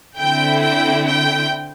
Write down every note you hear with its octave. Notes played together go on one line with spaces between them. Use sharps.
D3 C4 E4 G5
G5
G5